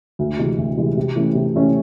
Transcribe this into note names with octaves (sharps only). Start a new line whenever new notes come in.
D2
C3 E3 G#3
D2
C3 E3 G#3
C3
E3 A3 C#4
C3
E3 A3 C#4